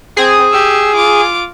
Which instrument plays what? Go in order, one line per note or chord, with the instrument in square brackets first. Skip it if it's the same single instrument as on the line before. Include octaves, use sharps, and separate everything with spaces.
[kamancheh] C4 [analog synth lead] G#4
[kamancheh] G4 E6
F4 D6